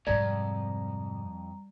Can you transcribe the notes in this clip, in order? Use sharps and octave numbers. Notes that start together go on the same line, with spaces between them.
F2 G#2 C3 G3 D5 A#5